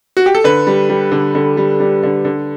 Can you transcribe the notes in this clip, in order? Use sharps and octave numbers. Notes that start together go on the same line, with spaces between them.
F#4
G4
A4
D3 B4
G3
G3
D3
D3
G3
G3
D3
D3